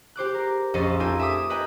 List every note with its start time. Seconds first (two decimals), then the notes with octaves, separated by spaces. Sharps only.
0.16 G4 C5 D6 F#6
0.34 A#4
0.74 A#1 F2 C#4 D#5 C6 A6
1.00 D#4 F4 G4 A4 G#5
1.19 E5 G#5 D6 D#6 B6
1.50 A#4 B4 D#5 G5 G#5 B5